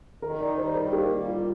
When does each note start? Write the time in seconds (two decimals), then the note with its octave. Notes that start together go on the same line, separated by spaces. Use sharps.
0.22 D#3 A#4
0.40 D#4 D5
0.57 G3 C5
0.75 D#3 A#4
0.93 A#3 G4
1.11 G3
1.28 D#3 F4